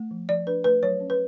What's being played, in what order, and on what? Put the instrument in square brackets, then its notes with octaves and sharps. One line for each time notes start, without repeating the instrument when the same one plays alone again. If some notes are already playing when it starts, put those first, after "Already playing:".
Already playing: [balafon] A3
F3
F3 D5
D4 B4
A3 B4
F#3 C#5
C#4
B4